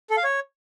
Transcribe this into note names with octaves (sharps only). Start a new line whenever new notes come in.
A4
F5
C#5